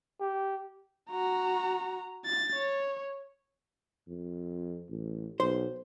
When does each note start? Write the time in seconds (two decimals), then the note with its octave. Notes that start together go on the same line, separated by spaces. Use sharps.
0.20 G4
1.11 F#4 A#5
2.26 A6
2.54 C#5
4.08 F2
4.89 A1
5.40 B1 C5